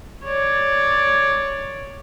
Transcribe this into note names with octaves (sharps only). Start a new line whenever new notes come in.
C#5 D5